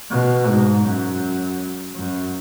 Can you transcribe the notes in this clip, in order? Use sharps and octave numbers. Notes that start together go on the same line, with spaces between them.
B2
G#2
F#2
F#2